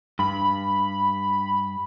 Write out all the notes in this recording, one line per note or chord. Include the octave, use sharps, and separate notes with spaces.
G2 B5